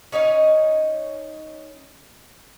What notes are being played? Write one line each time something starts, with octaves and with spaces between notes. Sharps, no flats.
C#4 D#4 C#5 D#5